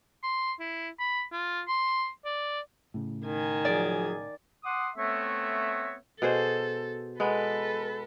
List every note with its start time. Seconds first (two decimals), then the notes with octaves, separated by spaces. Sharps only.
0.23 C6
0.60 E4
0.99 B5
1.32 F4
1.68 C6
2.25 D5
2.94 A2 C#3
3.25 D#3 G#5
3.65 F3 F#3 G#4 D5
4.64 F#5 C6 D6 D#6
4.96 A3 B3 C4 C#5 E5
6.22 B2 G#4 A4 C5
7.20 G#3 B3 A4 B4